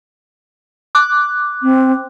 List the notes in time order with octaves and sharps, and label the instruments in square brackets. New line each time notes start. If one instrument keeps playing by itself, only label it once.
[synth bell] D6 F#6
[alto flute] C4